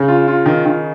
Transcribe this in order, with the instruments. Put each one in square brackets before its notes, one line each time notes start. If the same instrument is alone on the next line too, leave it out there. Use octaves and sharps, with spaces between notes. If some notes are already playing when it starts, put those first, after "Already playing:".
Already playing: [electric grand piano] C#3
[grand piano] F4
F4
D#3
D#3